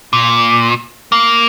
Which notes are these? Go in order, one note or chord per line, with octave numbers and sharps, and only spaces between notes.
A#2
A#3